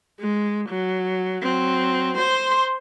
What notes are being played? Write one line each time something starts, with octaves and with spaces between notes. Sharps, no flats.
G#3
F#3
F#3 C4
C5 C6